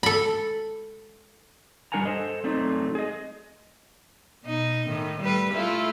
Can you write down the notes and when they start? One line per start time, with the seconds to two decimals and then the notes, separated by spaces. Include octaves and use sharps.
0.03 A4 B5
1.92 G3 D4 A#4 F#5 G#5 A#5
2.05 A4 C5 D#5
2.44 F#3 A3 C4 D#4 D5
2.95 G#4 D#5
4.45 B2 D#4
4.88 A2 D#3
5.20 G3 A3 B4
5.53 A3 E4 F4